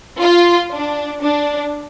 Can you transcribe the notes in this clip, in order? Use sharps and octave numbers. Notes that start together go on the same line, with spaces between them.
F4
D4
D4